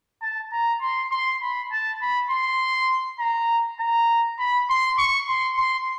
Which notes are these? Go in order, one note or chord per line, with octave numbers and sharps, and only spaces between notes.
A5
A#5
C6
C6
B5
A5
B5
C6
A#5
A#5
B5
C6
C#6
C6
C6